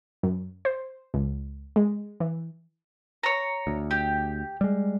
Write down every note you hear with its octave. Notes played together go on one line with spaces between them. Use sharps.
F#2
C5
C#2
G#3
E3
C#5 A#5
D2
G4
G3 G#3